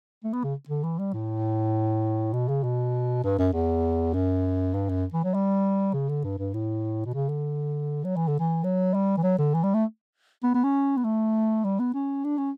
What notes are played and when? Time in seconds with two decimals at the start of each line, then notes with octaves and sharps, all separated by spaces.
0.24 A3
0.33 B3
0.44 C#3
0.68 D3
0.83 E3
0.99 G3
1.13 A2
2.33 B2
2.48 C#3
2.64 B2
3.24 G2
3.39 F#2
3.54 E2
4.14 F#2
4.74 G2
4.89 F#2
5.13 E3
5.24 F#3
5.34 G3
5.94 C#3
6.09 D3
6.24 G2
6.38 G2
6.54 A2
7.06 B2
7.14 C#3
7.29 D3
8.04 F#3
8.16 E3
8.28 D3
8.40 E3
8.64 F#3
8.94 G3
9.17 E3
9.23 F#3
9.38 D3
9.54 E3
9.64 G3
9.74 A3
10.43 B3
10.54 B3
10.64 C#4
10.97 B3
11.04 A3
11.64 G3
11.80 B3
11.94 C#4
12.24 D4
12.38 C#4